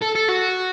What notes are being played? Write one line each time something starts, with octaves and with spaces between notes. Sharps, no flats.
A4
A4
F#4